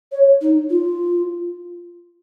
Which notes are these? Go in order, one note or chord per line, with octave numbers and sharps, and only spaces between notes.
C#5
D#4
F4